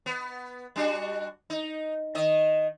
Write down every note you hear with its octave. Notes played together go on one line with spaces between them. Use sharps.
B3
G3 D4 F#4
D#4
D#3 D#5